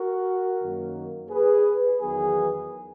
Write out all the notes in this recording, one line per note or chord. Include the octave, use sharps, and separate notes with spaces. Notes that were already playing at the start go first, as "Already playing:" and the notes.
Already playing: F#4 A#4
F#2 D#3 F#3 A#3
G#4 B4
E2 D#3 F#3 B3 G#4 B4